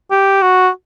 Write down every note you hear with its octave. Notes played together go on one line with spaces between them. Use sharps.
G4
F#4